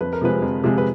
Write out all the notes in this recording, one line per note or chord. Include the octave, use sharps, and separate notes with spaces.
F2 B4
A#4
C3 F3 G#3 B4
F2
C3 F3 G#3
B4